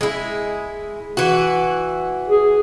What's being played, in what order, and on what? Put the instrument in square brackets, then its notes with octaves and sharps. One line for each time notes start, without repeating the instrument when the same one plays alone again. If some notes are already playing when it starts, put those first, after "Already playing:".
[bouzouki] G#3 E4
E3 F#4
[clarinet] G#4